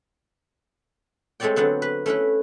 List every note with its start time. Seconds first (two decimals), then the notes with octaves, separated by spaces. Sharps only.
1.40 G#3 A3 C4 C#5 D5 G5
1.56 D3 F#3 B3 C4
1.82 B4
2.06 A3 C#4 E4 B4